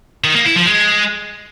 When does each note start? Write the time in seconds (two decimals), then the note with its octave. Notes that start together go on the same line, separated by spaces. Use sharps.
0.24 D#3
0.35 A#3
0.45 E4
0.56 F3
0.66 G#3